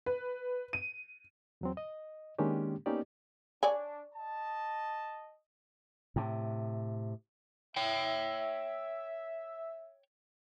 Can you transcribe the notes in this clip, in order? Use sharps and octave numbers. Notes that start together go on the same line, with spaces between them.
B4
D#7
E2 F#3 C4
D#5
D#3 G#3 A#3 C#4 D4 G4
A#3 B3 C#4 D#4 G4 D5
D4 C#5 D5 G#5
D#5 A5
A2 C3
C#5 E5 G5